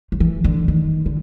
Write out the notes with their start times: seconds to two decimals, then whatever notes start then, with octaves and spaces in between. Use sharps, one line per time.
0.12 F3
0.20 E3
0.44 D3
0.68 D#3
1.06 D3